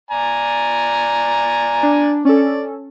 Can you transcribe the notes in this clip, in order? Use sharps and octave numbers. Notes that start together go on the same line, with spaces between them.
D5 G#5 A#5
D4
C#4 A4 D5